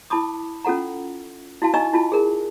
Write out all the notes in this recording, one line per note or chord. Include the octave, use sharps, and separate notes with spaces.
E4 A5 B5 D6 D#6
C#4 F4 A4 F#5 A#5
E4 F#4 F5 A5
D#4 D#5 G#5 A#5 C#6 E6
E4 F4 A5
G#4 A#4